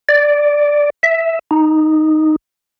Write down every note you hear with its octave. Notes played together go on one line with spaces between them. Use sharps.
D5
E5
D#4